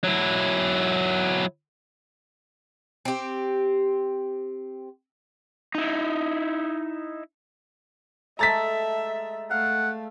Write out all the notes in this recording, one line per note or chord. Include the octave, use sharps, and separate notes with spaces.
F#3 E4
C4 G4
D#4 E4
G#3 A3 A4 E5 A#5 A6 B6
A3 F5 F#5